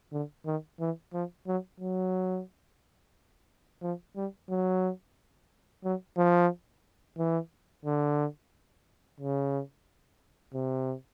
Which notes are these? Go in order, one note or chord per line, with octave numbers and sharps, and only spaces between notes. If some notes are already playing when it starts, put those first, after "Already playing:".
D3
D#3
E3
F3
F#3
F#3
F3
G3
F#3
F#3
F3
E3
D3
C#3
C3